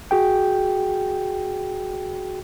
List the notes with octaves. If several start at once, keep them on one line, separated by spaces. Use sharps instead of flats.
F#4 G#4 G5